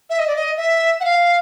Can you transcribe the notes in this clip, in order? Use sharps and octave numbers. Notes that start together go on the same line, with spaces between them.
E5
D#5
D5
D#5
E5
F#5
F5